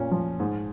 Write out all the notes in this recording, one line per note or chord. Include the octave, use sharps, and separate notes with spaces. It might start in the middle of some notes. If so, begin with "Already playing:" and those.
Already playing: A#2 C#4
F3
G#2